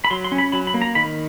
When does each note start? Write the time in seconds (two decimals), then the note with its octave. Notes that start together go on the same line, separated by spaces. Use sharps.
0.05 B5
0.11 F#3 C6
0.24 C6
0.32 C#4
0.38 B5
0.52 F#3 B5
0.67 B5
0.74 A#3
0.82 A#5
0.95 D#3 B5